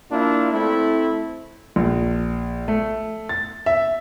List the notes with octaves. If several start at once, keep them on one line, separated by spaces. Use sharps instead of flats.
A#3 D4 E4 F4
A3 C4 E4
A#1
A3
A6
E5